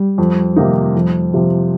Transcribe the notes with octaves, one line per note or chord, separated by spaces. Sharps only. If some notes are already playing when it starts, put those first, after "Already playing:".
Already playing: G3
F2
C3 D#3 A#3 D#4
F2
C3 F3